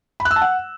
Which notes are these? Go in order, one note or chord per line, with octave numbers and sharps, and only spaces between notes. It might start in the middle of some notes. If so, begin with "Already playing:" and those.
B5
F#6
E6
A5
F#5